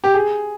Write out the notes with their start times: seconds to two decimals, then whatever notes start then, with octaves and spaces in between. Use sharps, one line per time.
0.04 G4
0.14 G#4